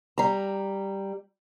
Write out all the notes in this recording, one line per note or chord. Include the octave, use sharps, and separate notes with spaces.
G3 A#5